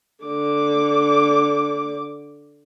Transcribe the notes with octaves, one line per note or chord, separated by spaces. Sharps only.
D3 D6